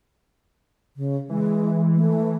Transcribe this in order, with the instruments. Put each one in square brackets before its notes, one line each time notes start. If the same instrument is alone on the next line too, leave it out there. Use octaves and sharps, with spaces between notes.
[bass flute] C#3
[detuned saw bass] E3 [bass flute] G#3
[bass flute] A3